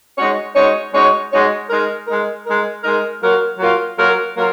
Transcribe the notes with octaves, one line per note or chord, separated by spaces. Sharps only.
G#3 D#4 F#4 C#5
G#3 D#4 F#4 C#5
G#3 D#4 F#4 C#5
G#3 D#4 F#4 C#5
G#3 D#4 A#4
G#3 D#4 A#4
G#3 D#4 A#4
G#3 D#4 A#4
F#3 A#3 F4 A#4
F#3 A#3 F4 A#4
F#3 A#3 F4 A#4
F#3 A#3 F4 A#4